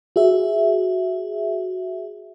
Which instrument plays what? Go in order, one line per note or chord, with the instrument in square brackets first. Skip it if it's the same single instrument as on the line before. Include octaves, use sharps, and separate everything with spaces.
[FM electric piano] F#4 G#4 E5